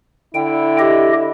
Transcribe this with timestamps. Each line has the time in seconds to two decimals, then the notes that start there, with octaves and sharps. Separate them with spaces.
0.35 D3 E4 G5
0.79 G4 D#5